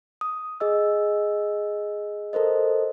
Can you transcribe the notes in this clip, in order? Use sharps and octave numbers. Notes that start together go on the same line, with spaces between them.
D#6
G#4 D#5 E6
A4 A#4 C5 D#5